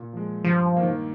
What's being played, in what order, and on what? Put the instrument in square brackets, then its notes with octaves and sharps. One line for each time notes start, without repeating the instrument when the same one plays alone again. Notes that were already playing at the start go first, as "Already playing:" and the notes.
Already playing: [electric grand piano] A#2
F3 G#3
[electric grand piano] G2 [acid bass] F3
[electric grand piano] D#3 A#3